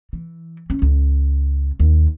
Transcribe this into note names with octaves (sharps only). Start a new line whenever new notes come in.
E3
C#4
C#2
D#2